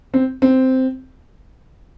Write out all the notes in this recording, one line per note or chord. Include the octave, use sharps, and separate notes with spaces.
C4
C4